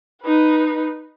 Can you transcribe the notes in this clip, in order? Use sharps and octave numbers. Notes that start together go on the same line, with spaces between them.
D#4 B4